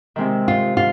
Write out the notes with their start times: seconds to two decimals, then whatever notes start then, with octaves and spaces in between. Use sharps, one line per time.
0.16 C3 D#3 G#3 C4
0.48 F4
0.77 F4